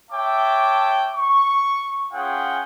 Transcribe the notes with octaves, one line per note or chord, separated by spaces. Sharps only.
C#5 E5 G5 A5 D6
C#6
C#4 F4 G#4 F#5 G5